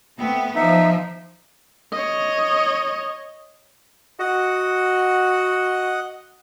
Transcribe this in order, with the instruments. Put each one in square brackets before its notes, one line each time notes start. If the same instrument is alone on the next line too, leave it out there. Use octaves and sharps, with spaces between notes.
[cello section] A3 B3 [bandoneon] C4
[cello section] F3 [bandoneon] D#4 E5
[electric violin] C#5 D#5
[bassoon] F#4 [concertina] D#5 F#5